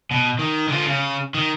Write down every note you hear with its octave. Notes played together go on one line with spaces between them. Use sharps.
B2
D#3
D3 F4
C#3
D#3